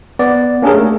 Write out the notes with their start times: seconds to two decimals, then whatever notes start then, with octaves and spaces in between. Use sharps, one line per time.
0.19 B3 D5
0.62 A#3 C#4 D4 G4 G#4 A#4
0.74 A3